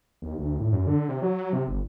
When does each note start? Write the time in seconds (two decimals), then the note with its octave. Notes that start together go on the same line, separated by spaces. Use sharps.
0.22 D#2
0.38 D2
0.60 A2
0.72 F#2
0.87 D3
1.09 C3
1.22 F#3
1.53 C3
1.67 G1